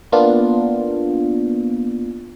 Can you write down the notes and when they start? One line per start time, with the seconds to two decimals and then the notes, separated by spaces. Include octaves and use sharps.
0.12 A#3 B3 D4 F4